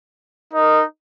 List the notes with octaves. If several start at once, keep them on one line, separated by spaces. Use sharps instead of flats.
D#4 A#4 D#5